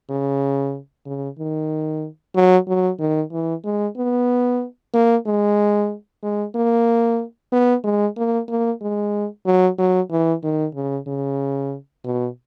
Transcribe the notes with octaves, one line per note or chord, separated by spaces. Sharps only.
C#3
C#3
D#3
F#3
F#3
D#3
E3
G#3
B3
A#3
G#3
G#3
A#3
B3
G#3
A#3
A#3
G#3
F#3
F#3
E3
D#3
C#3
C#3
B2